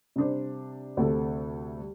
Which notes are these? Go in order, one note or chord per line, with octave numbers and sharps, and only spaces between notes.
C3 G3 D4 C5
D2 C3 A3 C4 A4
G3